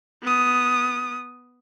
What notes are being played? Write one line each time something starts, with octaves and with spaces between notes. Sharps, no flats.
B3 D#6